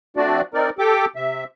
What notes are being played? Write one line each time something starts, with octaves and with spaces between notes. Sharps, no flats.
F3 A3 C4 D4 F#4 D5
C4 D#4 A#4 D5
G4 A4 G5 D6
C3 E5